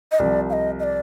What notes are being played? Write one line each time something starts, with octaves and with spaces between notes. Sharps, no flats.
D#5
C2 C3 F3 D5
F5
D#5
D#5
D5